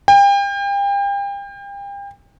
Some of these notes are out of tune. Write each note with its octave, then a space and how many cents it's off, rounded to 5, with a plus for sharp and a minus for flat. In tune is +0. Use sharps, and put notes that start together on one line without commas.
G5 +35